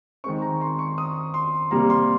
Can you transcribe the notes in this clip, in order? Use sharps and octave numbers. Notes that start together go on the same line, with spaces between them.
D#3 G#3 C4 C#6
A#5
C6
C#6
D#6
C6
C3 G3 A#3 A#5
C6